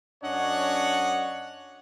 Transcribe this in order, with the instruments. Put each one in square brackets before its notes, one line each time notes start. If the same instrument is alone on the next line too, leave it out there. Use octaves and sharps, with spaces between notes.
[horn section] F#2 C#4 D4 C#5 D#5 F#5